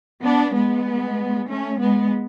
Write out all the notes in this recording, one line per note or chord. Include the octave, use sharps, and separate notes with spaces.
B3 D4
G#3 B3
A3 C#4
G#3 B3